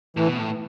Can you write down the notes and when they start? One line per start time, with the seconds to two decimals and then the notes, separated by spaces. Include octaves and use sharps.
0.17 A2 E3
0.27 B2
0.38 A2